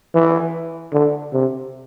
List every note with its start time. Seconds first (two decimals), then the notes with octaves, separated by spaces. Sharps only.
0.15 E3
0.93 D3
1.33 C3